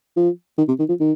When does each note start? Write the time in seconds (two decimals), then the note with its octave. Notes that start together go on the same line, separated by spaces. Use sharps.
0.17 F3
0.58 D#3
0.68 C3
0.79 D#3
0.89 F3
1.00 D#3